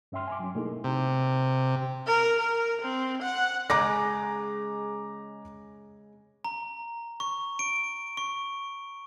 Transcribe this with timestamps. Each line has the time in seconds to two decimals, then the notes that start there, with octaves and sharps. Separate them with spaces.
0.12 G2 C#4 E5 G5 C6 F6
0.28 G#5 C6 D6
0.40 F#3 C#4
0.55 B2 A3 A#3 D#4 E4 G#4
0.84 C3
2.07 A#4
2.39 A#4
2.81 C4
3.22 F#5
3.70 C#3 G#3 A#5 D6 A#6
6.45 A#5
7.20 C#6
7.59 D7
8.17 C#6